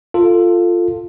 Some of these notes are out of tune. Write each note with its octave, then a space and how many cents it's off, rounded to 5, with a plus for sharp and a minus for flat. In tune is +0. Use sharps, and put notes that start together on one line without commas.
F4 +0 A4 +15